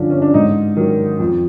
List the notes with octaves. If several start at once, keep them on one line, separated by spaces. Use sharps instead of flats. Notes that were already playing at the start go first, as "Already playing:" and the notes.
Already playing: G2 D3 F3 C#4 D4
C#4
D4
G#2 D#4
D#3 F#3
F2